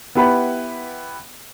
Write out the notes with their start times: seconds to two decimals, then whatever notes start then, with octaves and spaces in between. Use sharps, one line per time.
0.15 B3 E4 G4 B4 F#5 B5